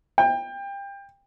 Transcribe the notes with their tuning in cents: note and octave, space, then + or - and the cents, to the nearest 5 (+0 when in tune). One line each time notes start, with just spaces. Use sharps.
G5 +25